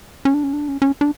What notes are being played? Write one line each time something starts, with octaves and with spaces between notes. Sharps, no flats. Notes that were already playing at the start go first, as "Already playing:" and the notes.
C#4
D4
C#4
D4
C#4
C#4
D4